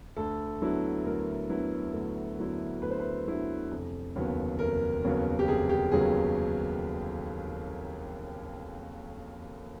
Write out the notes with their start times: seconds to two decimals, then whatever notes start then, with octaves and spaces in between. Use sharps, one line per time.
0.16 D2 A4
0.61 D3 F#3 B3 E4
1.05 D2 A#4
1.49 D3 F#3 B3 E4
1.93 D2
2.38 D3 F#3 B3 E4
2.82 D2 B4
2.90 C5
2.99 B4
3.27 D3 F#3 B3 E4
3.71 F1
4.15 D#2 C#3 F#3 B3
4.59 F1 A#4
5.04 D#2 C#3 F#3 B3
5.39 G4
5.48 F1 G#4
5.69 G4
5.92 D#2 C#3 F#3 B3 G#4